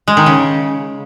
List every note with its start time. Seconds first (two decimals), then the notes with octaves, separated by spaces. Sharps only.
0.08 G#3
0.17 D#3
0.26 C#3